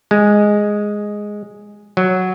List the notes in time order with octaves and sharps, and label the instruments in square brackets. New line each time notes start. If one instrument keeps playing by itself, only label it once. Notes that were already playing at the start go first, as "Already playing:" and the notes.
[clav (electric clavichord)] G#3
F#3